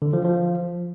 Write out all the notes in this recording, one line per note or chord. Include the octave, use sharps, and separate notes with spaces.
D3
F3
F3